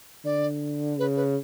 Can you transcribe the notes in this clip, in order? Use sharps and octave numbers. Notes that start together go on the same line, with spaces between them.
D3 D5
C#3 B4
B4